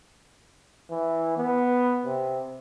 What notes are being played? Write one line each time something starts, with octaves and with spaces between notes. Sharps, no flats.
E3
B3
C3